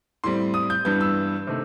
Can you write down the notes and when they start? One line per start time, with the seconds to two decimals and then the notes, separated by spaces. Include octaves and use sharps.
0.24 A2 G3 C4 C6
0.54 D#6
0.70 G6
0.85 G2 E3 G3 B3 G6
1.01 E6
1.47 C3 D#3 A3